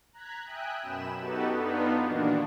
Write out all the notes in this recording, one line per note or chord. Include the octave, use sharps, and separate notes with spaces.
A#5 F#6 G#6 B6
E5 G5 G#5 D#6 F#6
F#2 B2 B5 E7
B3 D#4 F#4 G4 A4 B4
B3 D4 D#4 F4
A#2 D#3 E3 A#3 D4 F#4